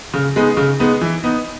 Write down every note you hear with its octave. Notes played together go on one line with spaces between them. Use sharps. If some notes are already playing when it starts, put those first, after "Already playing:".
C#3
G#3 B3 D#4
C#3
G#3 B3 D#4
E3
B3 D#4